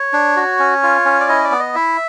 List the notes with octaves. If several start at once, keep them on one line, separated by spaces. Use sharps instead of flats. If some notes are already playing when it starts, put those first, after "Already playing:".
Already playing: C#5
D4
F#4
C#4
F4
C#4
D5
E4 D#5
D5
B3
D#5
E4 E5